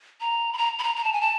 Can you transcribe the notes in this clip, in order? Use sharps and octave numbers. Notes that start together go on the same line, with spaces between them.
A#5
B5
A#5
B5
A#5
A#5
A5
G#5
A5